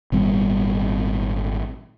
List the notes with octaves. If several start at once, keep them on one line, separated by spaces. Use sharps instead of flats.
G#1 A#2 G3 B3